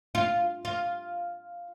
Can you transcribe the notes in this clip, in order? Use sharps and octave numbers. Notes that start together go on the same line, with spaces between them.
F4
F4